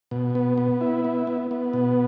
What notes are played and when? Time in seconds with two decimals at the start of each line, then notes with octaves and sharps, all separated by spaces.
0.11 B2
0.35 B3
0.58 B3
0.81 E4
1.05 B3
1.27 B3
1.51 B3
1.73 B2